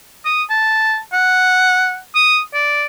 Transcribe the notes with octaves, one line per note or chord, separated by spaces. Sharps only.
D#6
A5
F#5
D#6
D5